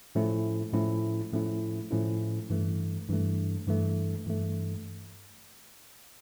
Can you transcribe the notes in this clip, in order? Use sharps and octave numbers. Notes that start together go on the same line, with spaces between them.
A2 F3 A3 C#4 E4
A2 F3 A3 C#4 E4
A2 F3 A3 C#4 E4
A2 F3 A3 C#4 E4
G2 E3 A3
G2 E3 A3
G2 E3 A3
G2 E3 A3